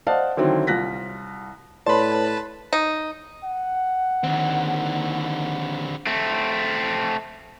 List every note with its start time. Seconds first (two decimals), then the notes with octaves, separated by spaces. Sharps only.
0.07 C5 D5 D#5 F5 F#5 A5
0.37 D3 D#3 F#3 C4 E4
0.67 C2 F4 F#6 A#6 B6
1.86 A2 B4 C#5 D5 A5 B5 C6
2.73 D#4
3.44 F#5
4.24 D#2 D3 C4
6.07 A3 C4